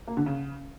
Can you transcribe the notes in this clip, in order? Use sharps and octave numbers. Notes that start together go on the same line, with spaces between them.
A#3
D3
C#3